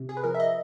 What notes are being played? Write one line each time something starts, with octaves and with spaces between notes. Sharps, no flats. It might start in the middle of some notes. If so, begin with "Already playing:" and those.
Already playing: C3
G#4
B4
F3 A#4
E5
D#5